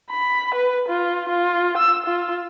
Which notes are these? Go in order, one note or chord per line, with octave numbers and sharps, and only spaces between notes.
B5
B4
F4
F4
E6
F4